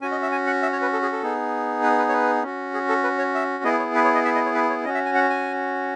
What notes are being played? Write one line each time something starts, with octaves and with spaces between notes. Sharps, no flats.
C#4 F#4 G#5
D#5
E5
G#5
F#5
E5
C#5
B4
A4
G#4
A4
B3 D#4 G#4
B4
B4
C#5
B4
C#4 F#4
G#4
A4
B4
C#5
E5
B3 E4 G#4 D#5
C#5
B4
C#5
D#5
E5
D#5
C#5
B4
C#5
C#4 F#4 D#5
E5
G#5
F#5
G#5